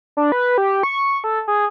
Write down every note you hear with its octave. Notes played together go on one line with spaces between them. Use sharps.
D4
B4
G4
C#6
A4
G#4